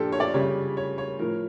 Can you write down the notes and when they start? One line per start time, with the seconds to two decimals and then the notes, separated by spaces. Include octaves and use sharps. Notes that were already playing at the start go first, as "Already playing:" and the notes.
Already playing: A#2 F3 D4 F4 G4 A4
0.12 C#5
0.20 D5
0.34 C#3 G3 C#5
0.77 C#5
0.98 C#5
1.19 A2 F3 A#4